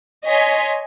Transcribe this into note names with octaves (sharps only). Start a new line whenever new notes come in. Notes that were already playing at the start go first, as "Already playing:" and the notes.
C#5 D#5 G#5 C6 B6